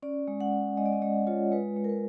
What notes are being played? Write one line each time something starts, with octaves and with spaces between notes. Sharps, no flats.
C#4 D5
G#3
F#5
C#4
G#3 D#5
D5
D#5
G#3 D5
F4 C#5
G#3 B4
G#3
A#4
B4